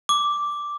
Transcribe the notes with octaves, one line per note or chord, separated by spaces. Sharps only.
D6